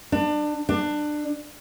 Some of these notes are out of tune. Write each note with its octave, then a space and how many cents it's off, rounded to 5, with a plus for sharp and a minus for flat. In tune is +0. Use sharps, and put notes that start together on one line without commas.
D4 +25
D4 +20